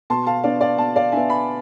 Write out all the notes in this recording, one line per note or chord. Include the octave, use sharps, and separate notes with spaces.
B2 A5 C6
F5 A5
B3 D4 D5 F5
D5 F5
B2 F5 A5
D5 F5
B3 D4 E5 G#5
G#5 B5